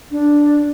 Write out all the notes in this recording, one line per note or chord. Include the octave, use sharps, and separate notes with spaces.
D4